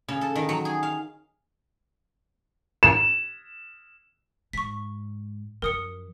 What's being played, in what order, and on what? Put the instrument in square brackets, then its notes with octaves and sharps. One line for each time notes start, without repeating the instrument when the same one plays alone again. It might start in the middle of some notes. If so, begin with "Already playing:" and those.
[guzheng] C#3
A4
D#3
F#3
G#4
F5
[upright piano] E7
[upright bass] G#2 [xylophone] C#6 B6
[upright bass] F#2 F3 [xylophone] A#4 D#6 C#7